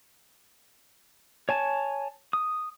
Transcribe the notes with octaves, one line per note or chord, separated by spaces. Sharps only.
C#5 G#5 A5
D#6